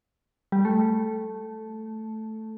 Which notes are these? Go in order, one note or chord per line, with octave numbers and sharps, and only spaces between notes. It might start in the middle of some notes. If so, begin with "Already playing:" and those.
G3
A3